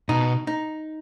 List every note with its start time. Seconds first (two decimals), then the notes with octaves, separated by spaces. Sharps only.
0.09 B2 D#4
0.47 D#4